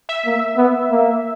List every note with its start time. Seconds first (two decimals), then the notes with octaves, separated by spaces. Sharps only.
0.09 E5
0.25 A#3
0.57 B3
0.91 A#3